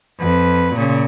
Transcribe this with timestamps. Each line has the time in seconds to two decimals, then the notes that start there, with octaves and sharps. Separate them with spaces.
0.20 F2 B4
0.75 A#2 C#3